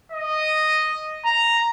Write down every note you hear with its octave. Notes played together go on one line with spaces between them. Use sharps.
D#5
A#5